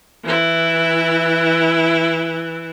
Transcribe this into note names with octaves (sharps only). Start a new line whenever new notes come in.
E3 E4